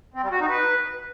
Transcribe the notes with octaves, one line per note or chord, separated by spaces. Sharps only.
C4
G3
F#4
D#4
B4